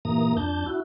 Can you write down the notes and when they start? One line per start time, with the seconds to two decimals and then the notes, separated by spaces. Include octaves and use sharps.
0.05 G2 A#2 E3 A#3 A#5 D#6
0.37 F2 D4 A5 G6
0.66 E4 F#4